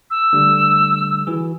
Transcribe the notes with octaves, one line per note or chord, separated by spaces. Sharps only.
E6
D3 G3 A3
E3 F#4 G#4